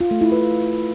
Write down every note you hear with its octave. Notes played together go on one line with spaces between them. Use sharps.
F4
A3
E4
B4